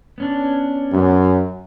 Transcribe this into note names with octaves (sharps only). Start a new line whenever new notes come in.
B3 C#4 D4
F#2